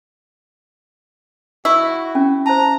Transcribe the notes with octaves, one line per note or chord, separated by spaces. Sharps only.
E4 F#4 C#6
C#4
C5 A5 A#5